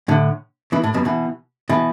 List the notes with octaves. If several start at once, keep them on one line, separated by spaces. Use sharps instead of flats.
A2 D3
B2 E3
A2
F#2 B2
B2 E3
B2 E3